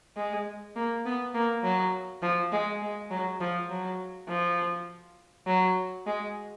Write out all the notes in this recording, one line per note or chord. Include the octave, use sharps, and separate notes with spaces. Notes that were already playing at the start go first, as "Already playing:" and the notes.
G#3
A#3
B3
A#3
F#3
F3
G#3
G#3
F#3
F3
F#3
F3
F#3
G#3